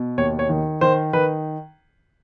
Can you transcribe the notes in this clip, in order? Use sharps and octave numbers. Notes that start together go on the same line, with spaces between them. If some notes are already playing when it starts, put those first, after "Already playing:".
Already playing: B2
D#2 C#5
C#5
D#3
D#3 C5
D#3 B4